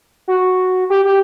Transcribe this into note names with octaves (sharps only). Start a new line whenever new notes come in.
F#4
G4
G4